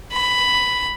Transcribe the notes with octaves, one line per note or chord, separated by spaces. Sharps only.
B5